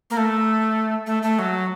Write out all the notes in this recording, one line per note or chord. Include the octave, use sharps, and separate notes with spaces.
A#3
A3
A3
A3
F#3